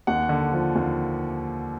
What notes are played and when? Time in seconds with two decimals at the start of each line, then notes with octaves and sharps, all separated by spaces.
0.07 D#2 F#5
0.29 D3
0.52 F3
0.75 D#2